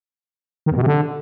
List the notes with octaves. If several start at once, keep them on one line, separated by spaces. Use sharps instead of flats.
D#3
E2
B2
C3
D3